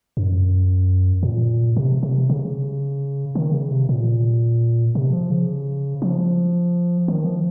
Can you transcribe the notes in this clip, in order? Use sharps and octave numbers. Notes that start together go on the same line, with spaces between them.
F#2
A#2
C3
C3
C#3
D#3
C#3
C3
A#2
C3
F3
C#3
F3
D#3
F3